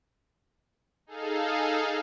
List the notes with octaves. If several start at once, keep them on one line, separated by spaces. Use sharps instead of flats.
D#4 G#4 A4 F5